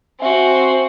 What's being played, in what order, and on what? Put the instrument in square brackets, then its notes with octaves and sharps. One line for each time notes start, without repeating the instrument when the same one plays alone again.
[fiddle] C4 F#4 [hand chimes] E5 G#5